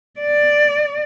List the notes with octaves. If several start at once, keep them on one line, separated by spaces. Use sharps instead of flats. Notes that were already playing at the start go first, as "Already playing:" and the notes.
D5